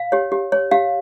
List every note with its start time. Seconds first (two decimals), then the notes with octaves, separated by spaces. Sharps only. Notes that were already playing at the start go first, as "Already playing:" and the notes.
Already playing: F5
0.12 G4 C#5
0.32 G4
0.52 C#5
0.71 G4 F5